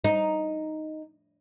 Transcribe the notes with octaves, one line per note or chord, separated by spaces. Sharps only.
D#4